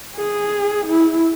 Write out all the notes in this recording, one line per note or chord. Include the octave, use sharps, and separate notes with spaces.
G#4
E4